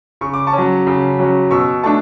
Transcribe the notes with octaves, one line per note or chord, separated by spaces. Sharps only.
C#3 C#6
D6
A5 C#6
F#3 C#4
C#3
F#3 C#4
B2 C#6 E6
A3 D4 A5 C#6